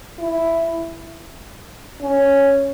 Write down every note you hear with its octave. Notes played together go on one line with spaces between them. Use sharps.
E4
C#4